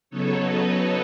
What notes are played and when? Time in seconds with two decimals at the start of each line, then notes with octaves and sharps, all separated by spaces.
0.10 C#3 F#3 B3 D#4 A4 C#5
0.39 B4 D#5